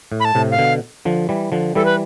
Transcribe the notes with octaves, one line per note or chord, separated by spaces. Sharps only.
A2
B5
A5
A2 C3
F5
B2 D3
D3 F3
E3 G3
D3 F3
E3 G3 A4
B4